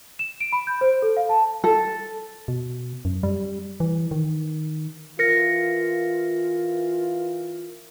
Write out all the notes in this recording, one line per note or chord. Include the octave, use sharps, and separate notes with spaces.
E7
D7
B5
G6
C5
A4
F5
A5
A4
B2
F#2
G3
E3
D#3
E3 F4 A#4 A#6 C#7